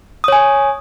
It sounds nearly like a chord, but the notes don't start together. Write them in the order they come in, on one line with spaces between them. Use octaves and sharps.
D#6 C#5 G#5